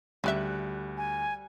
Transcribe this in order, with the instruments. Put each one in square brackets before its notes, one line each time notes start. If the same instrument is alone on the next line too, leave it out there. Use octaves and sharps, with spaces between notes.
[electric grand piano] D2 F#6 [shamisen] C#3 G4 E5 [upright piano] G3
[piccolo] G#5